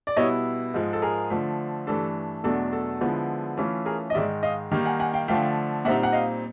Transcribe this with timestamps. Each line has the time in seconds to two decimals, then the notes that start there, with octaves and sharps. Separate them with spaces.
0.07 D5
0.16 B2 G3 B3 E4 C#5 D#5
0.74 G#2 F3 G#3
0.93 A4
1.02 G#4 A#4
1.30 D3 F3 A3
1.87 G2 E3 A3 D4 A4
2.44 E2 B2 F#3 A3 D4 A4
2.72 A4
3.01 D3 F3 G#3 B3 E4
3.58 E3 A3 C#4 F4
3.86 G#4 A#4
4.10 D#5
4.14 G#2 D#3 G#3 D5 E5
4.43 D#5 F5
4.72 D#3 G3 A#3 D#4
4.85 F#5 G#5
5.00 F#5 G#5
5.13 F5 G5
5.28 D3 F3 A3 F5 G5
5.85 A#2 G3 C4 D#4 E5 F#5
6.03 F#5
6.13 D#5 F5